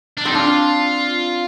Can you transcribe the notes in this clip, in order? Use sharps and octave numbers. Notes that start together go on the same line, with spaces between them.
D4
C4 D#4
D4 F4